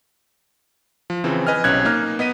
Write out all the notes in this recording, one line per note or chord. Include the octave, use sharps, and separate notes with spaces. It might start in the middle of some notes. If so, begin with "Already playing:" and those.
F3
C#3 E3 F3 C4
B4 D#5 G#5 F6
B1 C3 C#4 F#6 G#6
A#3 D#4 F6
B3 D#5 B6 D#7